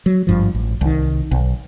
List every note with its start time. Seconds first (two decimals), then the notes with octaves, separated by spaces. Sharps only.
0.06 F#3
0.27 G#1 G2 F3
0.54 A1
0.81 C2 D#3
1.31 B1